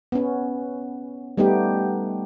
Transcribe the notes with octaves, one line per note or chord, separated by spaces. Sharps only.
B3 C#4
G3 A3 B3 D#4 G4